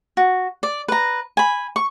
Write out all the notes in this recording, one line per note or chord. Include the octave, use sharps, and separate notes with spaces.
F#4
D5
B4 A#5
G#5 B5
C#6